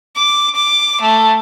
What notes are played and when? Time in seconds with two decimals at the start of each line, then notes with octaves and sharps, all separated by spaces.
0.16 D6
0.55 D6
1.01 A3